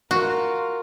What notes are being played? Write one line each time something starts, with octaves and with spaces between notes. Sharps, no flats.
F4 F#4 A#4